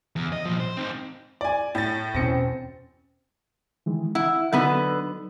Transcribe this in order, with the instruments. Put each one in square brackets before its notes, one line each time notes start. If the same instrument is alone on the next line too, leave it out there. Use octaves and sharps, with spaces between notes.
[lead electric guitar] E2
D#5
A#2 F3
C5
C4 D#4
[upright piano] D5 G#5
[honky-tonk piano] A2 A6
[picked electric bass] E2 B2 C#4 [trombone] C4 [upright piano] A#6 C#7
[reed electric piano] D#3 E3 G#3
[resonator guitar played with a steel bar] E4 [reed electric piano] F#5
[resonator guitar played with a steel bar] D3 B3 B4 [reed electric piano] F#3 D#4